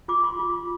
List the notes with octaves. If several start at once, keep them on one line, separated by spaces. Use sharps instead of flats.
F4 D6
C6
F4